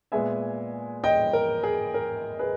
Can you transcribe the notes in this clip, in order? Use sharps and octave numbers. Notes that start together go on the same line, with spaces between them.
A#2 G#3 B3 E5 G#5
D#5 G5
A#4
G#4
A#4
G#4 B4